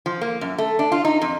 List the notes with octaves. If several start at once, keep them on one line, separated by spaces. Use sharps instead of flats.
F3
A#3
F#2
A3
D4
F4
D#4
F2